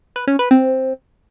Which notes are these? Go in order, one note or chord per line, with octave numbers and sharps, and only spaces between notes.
B4
C#4
B4
C4